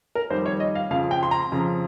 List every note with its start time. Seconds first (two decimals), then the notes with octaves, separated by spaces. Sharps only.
0.15 A#4
0.30 F2 D#3 G3 C5
0.46 C#5
0.60 D#5
0.75 F5
0.91 F2 C#3 F3 F5
1.11 G5
1.23 C6
1.31 A#5
1.52 F2 C#3 F3